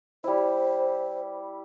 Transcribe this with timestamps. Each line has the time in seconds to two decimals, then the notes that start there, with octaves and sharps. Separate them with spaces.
0.24 G3 E4 C5